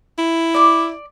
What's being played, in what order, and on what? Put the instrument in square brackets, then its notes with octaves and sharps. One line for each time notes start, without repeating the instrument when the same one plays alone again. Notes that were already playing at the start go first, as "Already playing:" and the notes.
[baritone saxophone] E4
[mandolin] D5 D6